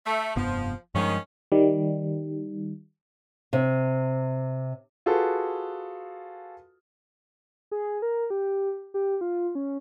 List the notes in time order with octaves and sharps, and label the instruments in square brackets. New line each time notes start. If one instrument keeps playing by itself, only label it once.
[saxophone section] A3
[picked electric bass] F1 G2 B3 [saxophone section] F3
[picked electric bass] G2 F3 G#3 [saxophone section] D#3 C#4
[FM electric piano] D#3 G3
[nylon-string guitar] C3
[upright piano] F4 F#4 G#4 A4 B4
[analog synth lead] G#4
A#4
G4
G4
F4
C#4